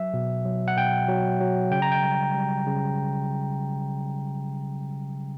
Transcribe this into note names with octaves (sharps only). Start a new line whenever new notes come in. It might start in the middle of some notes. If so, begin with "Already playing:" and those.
Already playing: F#3 E5
B2
F#3
F#5
B2 G5
F#3
F#3
C#3 G5
A#5
G5
G3
G3
C#3